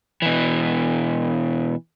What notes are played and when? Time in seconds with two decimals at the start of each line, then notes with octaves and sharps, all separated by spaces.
0.22 B2 E3